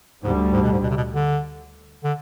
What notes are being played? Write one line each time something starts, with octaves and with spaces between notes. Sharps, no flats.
D2 G#2 D3 G3
G#2
B2
G#2
B2
C3
B2
D3
D3